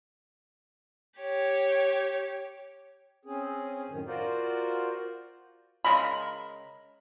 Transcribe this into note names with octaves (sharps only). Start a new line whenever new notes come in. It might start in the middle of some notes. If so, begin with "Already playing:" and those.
G4 C#5
C4 C#4 G#4
F#2 A2 D#3
F4 F#4 A#4 C5 D5
C#3 G#3 A#4 B5